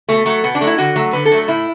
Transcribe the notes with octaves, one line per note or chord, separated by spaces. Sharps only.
B2 A3
F#3 A3
B2 B3
D4
F#3 A3
E4
D3 F#4
F#3 A3
D3 B4
A4
F#3 A3
A2 E4